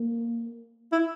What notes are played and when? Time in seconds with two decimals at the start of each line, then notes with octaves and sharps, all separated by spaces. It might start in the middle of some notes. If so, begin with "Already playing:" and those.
Already playing: A#3
0.92 E4